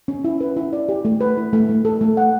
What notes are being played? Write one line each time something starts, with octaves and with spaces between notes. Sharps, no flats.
C#4
E4
B4
E4
D5
G4
A3
B4
E4
A3
A3
A4
A3
F#5